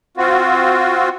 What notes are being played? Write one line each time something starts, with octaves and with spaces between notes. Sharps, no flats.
C4 F4 F#4